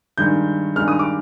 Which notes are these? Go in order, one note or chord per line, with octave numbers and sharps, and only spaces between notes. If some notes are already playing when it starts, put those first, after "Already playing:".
G2 D#3 G#3 G6
G2 D#3 G#3 F6
D#6
D6